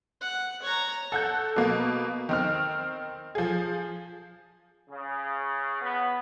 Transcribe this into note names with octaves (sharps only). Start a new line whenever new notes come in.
F#5
C#5 A#5
A4 F#5 F#6 G6
B2 A#3
D#3 C4 F6
F3 G#4
C#3
B3